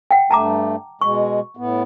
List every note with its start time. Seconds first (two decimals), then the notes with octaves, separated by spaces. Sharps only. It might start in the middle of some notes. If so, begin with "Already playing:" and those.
0.11 F#5 G5
0.31 G2 A3 A5 A#5 D6
1.01 B2 G#3 C#6
1.57 A2 B3